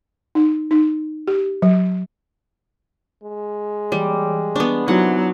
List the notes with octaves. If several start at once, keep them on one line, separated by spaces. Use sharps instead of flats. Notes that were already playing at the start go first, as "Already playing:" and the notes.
D#4
D#4
G4
F#3
G#3
E3 G3
B3 D4 C#6
C3 F#3 B3 D#4 E4 F#5